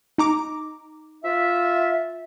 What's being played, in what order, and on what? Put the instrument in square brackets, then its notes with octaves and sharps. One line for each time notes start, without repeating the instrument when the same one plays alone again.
[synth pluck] D#4 A#5 D6
[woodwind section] F4 E5